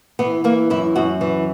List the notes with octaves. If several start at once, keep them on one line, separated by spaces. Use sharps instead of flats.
E3 B3
E3 A#3
F#2 E4
F#2 F#4
E3